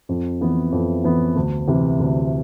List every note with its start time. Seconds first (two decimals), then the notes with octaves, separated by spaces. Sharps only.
0.09 F2
0.41 E3 B3
0.72 F2
1.04 E3 B3
1.36 D2
1.68 C3 E3
2.00 D2